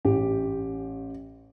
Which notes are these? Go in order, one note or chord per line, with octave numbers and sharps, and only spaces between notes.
A1 G4